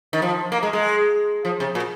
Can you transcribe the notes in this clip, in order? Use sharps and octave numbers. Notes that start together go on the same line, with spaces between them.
D#3
F3
A#3
G#3
G#3
F3
C3
A#2